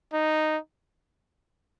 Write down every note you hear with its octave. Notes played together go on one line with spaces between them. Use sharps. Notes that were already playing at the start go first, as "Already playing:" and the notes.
D#4